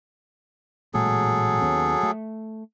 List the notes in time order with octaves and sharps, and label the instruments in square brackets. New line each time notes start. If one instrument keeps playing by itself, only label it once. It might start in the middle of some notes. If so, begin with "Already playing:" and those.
[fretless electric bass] A1 A#2 G#3 [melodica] F#3 G#4 A4
[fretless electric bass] D#2 B3 C#4
A3